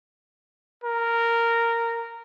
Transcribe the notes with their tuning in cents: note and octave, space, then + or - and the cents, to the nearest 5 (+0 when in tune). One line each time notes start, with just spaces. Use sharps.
A#4 -10